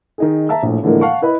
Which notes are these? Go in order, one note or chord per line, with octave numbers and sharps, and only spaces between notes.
D#3 D#4 G#4
E5 A5 A#5 E6
A#1 A2
A2 D3 E3 F3 G#3 A#3
F5 F#5 A5 C#6
E4 B4 D#5 B5